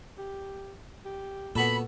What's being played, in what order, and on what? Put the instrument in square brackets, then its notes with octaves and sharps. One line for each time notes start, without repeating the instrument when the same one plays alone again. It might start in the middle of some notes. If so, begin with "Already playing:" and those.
[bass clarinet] G4
G4
[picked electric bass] A#2 [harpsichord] B3 F#4 A4 [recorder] B5